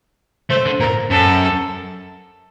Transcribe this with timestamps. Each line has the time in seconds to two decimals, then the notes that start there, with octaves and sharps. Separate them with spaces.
0.50 A3 C5
0.65 D3
0.80 A#2 A#4
1.10 F#2 A4